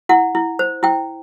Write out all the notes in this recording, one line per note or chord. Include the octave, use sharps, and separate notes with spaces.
E4 F#5
E4
C5
E4 G5